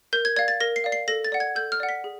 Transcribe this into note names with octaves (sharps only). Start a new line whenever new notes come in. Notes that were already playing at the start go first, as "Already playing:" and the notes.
A#4 G6
G#6
D5 F5 G#6
A6
A#4 A#6
C7
D5 F5
C7
A4 A#6
A6
D5 F#5
G#6
A4 G6
F6
D5 F#5
B6
G#4